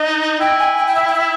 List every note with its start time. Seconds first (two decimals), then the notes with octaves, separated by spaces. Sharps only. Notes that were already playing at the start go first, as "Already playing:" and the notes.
Already playing: D#4 D#5
0.40 E4 G5
0.59 G#5
0.77 G5
0.87 G5
0.95 E5
1.08 G5
1.14 E5